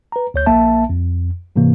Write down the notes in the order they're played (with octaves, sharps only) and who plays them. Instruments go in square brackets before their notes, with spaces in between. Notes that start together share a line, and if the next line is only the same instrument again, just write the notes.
[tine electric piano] B4 A#5
D2 C#5 G6
A#1 A#3 E5 A5
F2
G#2 C3 E3 A#3